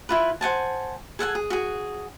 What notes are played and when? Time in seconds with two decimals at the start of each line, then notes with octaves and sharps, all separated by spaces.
0.09 E4 F4 B4
0.41 C5 F#5 G#5 A5
1.19 G#4 A4 F#5 G#5
1.35 G#4
1.50 F#4 G#4